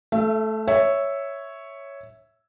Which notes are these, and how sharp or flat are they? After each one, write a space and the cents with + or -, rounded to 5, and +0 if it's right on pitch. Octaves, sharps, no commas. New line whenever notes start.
A3 -10 E5 +35
C#5 +0 E5 +0